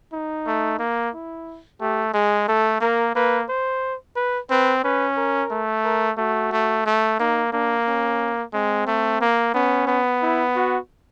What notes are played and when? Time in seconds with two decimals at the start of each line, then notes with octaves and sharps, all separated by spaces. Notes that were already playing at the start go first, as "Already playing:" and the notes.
0.13 D#4
0.47 A3
0.79 A#3
1.13 E4
1.81 A3 G4
2.14 G#3 G#4
2.48 A3 A4
2.81 A#3 A#4
3.15 A#3 B4
3.49 C5
4.16 B4
4.50 C4 B4
4.83 C#4 B4
5.17 A#4
5.51 A3
5.84 A#4
6.18 A3 F#4
6.52 A3
6.86 A3
7.19 A#3 D#4
7.53 A#3 D4
7.87 C#4
8.53 G#3 C4
8.87 A3
9.21 A#3
9.54 B3 C#4
9.88 B3
10.22 E4
10.56 F#4